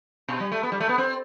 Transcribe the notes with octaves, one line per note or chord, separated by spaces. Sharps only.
B2
G3
A3
B3
G3
A3
B3
C4